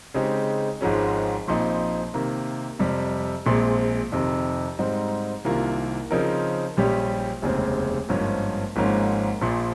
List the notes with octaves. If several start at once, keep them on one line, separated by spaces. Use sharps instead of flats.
C#3 G#3 C4 D#4 G4
G#1 G#2 F3 G#3 C#4
A#1 A#2 F3 C4 D#4
C3 D#3 A#3
F2 C3 G3
A#1 A#2 G#3 C4
F2 C3 D#3
G#2 G3 C4 D#4
C2 C3 D#3 A#3 F4
C#3 F3 C4 D#4 A#4
A#1 A#2 G3 C#4 G4
F1 D#2 C#3 G#3 C4
G#1 G2 F3 A#3 C#4
G#1 G#2 F3 A#3 C#4
A#1 A#2 F3